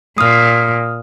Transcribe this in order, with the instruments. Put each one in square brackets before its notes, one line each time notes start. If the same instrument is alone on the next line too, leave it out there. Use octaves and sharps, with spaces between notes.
[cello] A#2 [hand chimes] D#6 F6